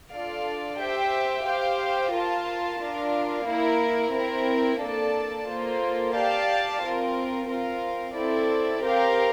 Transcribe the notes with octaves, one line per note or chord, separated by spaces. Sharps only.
D4 F4 A4 D5 F5
G4 C5 E5 G5
G4 C5 F5
F4 A#4 F5 A5
D4 F4 A#4 F5
A#3 E4 A#4
C4 E4 A#4
A#3 D4 A4 D5 A5
A#3 F4 A4 C5
G4 D5 F5 A5
C4 F4 A#4
C4 F4 A#4 F5
C4 E4 A4 D5
C4 G4 A#4 F5